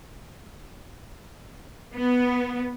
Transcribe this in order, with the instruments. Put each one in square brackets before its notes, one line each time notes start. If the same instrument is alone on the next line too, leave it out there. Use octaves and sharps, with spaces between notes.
[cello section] B3